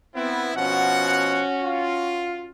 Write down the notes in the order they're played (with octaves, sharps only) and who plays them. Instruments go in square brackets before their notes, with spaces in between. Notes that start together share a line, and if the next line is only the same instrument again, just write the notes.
[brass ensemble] B3 E4 [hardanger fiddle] C4
[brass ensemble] B2 F3 F#5 [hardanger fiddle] C#4 F#4
[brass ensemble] F4